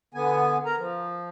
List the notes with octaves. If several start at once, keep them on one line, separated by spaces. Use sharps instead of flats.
D3 B3 G#5
A#4 A#5
F3